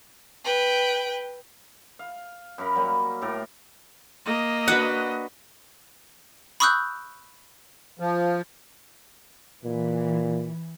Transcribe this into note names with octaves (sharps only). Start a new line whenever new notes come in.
B4 G5
F5
F#2 A#4 B5
F#3 G3 A#3
A2 G4 A4 A#4
A#3 D#5
D4 F#4 B4 F#5
B5 C#6 D#6 E6 F#6 G6
F3
A#2 E3